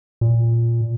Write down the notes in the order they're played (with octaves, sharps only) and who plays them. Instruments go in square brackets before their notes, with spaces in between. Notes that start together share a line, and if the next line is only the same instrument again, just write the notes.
[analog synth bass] A#2